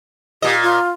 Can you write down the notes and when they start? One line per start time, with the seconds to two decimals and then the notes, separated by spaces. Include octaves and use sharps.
0.42 A#2 G4 D#5
0.62 F4